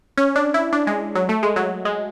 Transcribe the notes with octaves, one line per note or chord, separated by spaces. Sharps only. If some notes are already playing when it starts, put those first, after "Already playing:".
C#4
D4
E4
D4
G#3
F#3
A3
G#3
F#3
G#3